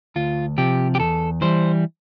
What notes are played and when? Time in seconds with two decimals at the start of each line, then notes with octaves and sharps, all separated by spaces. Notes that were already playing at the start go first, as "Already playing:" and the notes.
0.16 D2 F4
0.58 C3 F3 G4
0.95 G4
0.99 E2 A4
1.42 E3 G3 C5